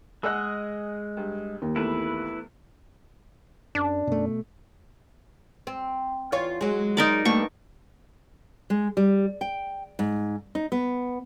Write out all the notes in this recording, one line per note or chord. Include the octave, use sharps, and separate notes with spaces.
G#3 G#4 D#5 F#5 E6 F#6
G2
D#2
E2 A3 E4 B4
F#2 D4
F#2 B2 A3
C4
E2 F4 C#5
F#3 G#3
D#4 A#4 D5
G2 A3 A#3 C#6
G#3
G3
G5
G#2
D#4
B3